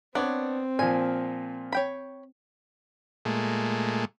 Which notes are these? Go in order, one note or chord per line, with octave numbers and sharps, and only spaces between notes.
B3 C4 D4 C#5 D5
A#2 F3 G#5
C#5 G5 B5
A#2 G#3 A3